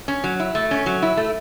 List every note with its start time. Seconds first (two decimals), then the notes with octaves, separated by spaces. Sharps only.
0.08 C#4
0.24 F#3
0.40 E4
0.55 A3
0.71 C#4
0.86 F#3
1.02 E4
1.17 A3